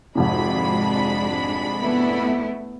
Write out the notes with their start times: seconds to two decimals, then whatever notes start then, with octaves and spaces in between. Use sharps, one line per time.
0.15 G#1 F2 C3 G#3 D4 B5
1.80 A3 B3 E4